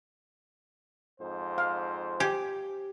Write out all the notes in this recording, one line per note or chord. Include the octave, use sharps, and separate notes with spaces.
F2 G#2 C5
F5
G4 G#5